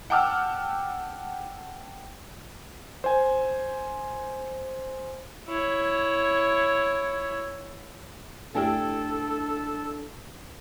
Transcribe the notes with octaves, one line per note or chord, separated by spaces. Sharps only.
F#5 G5 A5 D6 E6 F6
C5 G#5
E4 C#5
F#2 A3 D4 E4 G4 A4 G5